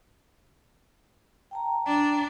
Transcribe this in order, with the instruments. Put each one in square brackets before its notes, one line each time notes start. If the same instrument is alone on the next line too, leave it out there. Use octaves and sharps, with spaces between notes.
[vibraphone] G5 A5 A#5
[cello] D4